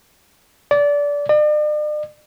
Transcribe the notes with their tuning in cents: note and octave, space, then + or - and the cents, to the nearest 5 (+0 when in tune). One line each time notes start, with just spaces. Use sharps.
D5 -20
D5 +45